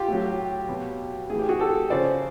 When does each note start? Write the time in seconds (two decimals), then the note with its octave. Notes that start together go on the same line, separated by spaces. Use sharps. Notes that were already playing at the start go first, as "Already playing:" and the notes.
Already playing: F4 G4
0.08 A2 F#3
0.69 B2 F#3
1.30 A2 E3 G#4
1.39 G4
1.49 F#4 G#4
1.59 G4 A4
1.90 C#3 F3 C5 D5